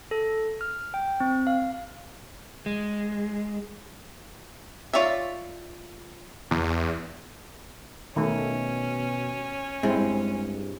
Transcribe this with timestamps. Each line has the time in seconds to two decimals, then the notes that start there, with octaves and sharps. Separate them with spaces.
0.11 A4
0.61 F6
0.94 G5
1.20 C4
1.47 F5
2.66 G#3
4.93 F4 C#5 D5 E5
6.51 E2
8.16 B2 D#3 A3 C#4
9.83 G2 G#3 C4 E4